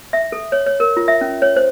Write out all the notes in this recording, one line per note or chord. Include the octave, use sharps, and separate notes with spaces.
E5
A4
C#5
C#5
A#4
F4
E5
C#4
C#5
C5